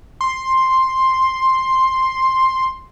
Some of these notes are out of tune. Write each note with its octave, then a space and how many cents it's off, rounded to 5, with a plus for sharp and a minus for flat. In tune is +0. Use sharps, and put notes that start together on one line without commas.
C6 +5